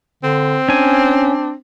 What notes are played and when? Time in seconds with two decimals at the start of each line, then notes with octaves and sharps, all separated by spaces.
0.24 D3 C4
0.69 C#4 D4 G#5